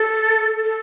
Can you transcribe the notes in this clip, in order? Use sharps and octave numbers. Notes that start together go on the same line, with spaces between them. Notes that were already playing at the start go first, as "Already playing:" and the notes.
Already playing: A4
A4